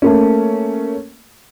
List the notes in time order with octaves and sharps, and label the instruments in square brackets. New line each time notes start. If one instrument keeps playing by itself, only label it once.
[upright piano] A3 A#3 C#4